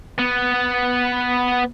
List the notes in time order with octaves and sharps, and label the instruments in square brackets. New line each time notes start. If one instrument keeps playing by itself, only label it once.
[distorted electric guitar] B3